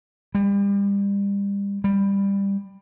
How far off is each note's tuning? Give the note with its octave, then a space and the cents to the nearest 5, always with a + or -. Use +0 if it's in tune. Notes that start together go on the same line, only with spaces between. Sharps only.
G3 +35
G3 +15